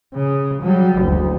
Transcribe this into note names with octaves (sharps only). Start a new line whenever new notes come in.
C#3
F#3 G3
F#1 D2